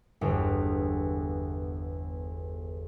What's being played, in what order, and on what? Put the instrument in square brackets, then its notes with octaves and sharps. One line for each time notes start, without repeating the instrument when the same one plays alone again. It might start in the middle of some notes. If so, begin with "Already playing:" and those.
[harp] G1 E2